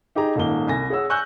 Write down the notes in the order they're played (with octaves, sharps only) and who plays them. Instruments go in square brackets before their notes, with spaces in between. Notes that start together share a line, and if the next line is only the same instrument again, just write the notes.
[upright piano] D#4 G4 G#4 A#5
D#1 G#2 A#3 G7
C2 G#5 A#6
G#4 C#5 F#5 E6
G#5 C#6 E6 F#6 G6 A#6